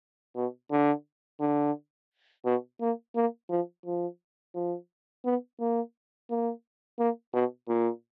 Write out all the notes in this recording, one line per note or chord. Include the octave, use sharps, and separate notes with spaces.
B2
D3
D3
B2
A#3
A#3
F3
F3
F3
B3
A#3
A#3
A#3
B2
A#2